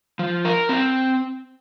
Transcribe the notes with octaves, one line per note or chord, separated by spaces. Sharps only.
F3
A#4
C4